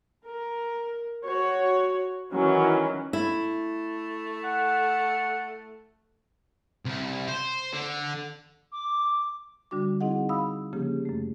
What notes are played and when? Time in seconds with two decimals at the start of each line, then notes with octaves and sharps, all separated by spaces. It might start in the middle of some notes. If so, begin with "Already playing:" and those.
0.24 A#4
1.24 F#4 C#5
2.33 D#3 E3 F#3 C#4
3.13 A3 E4
4.44 F#5
6.86 C2
7.29 C5
7.73 D3
8.72 D6
9.71 D3 G3 D4 F#4 D6
10.01 C4 D#4 E4 G#4 D#5 F#5
10.29 F5 B5 D#6 E6
10.73 C#3 F3 A#3 C#4 G4 G#4
11.05 F#2 A3